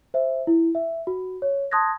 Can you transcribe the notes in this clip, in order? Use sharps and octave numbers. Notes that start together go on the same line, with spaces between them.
C5 E5
E4
E5
F#4
C#5
A5 C6 D#6 F#6 G#6 A#6